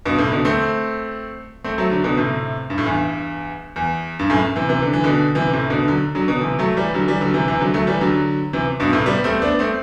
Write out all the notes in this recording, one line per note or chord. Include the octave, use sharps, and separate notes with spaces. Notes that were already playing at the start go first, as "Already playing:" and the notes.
G2 B2
A2 C3
B2 D3
A3 C4
A3 C4
F#3 A3
D3 F#3
B2 D3
A2 C3
G2
A2
E2 G2
E2
G2
F#2 A2
C3 E3
C3 E3
D3
E3
B2 D3
C3 E3
A2 C3
B2 D3
D3 F#3
D3 F#3
B2 D3
C3 E3
F#3 A3
E3 G3
D3 F#3
E3 G3
D3 F#3
C3 E3
C3 E3
D3 F#3
F#3 A3
E3 G3
D3 F#3
C3 E3
G2 B2
A2 C3
G3 B3
A3 C4
B3 D4
A3 C4